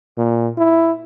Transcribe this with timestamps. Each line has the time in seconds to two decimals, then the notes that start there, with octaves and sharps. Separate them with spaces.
0.18 A#2
0.58 E4